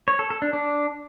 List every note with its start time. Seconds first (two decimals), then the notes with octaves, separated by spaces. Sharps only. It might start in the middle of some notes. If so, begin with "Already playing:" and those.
0.08 C#5
0.19 A4
0.30 A4
0.42 D4
0.53 D4